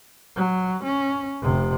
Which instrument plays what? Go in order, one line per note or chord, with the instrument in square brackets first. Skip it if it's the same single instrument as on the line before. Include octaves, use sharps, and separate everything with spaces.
[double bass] F#3
C#4
F1 C3